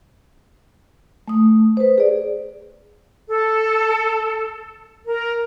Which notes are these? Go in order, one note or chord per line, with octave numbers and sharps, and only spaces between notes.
A3 D#6
B4 C5
G#4 D5
A4
A#4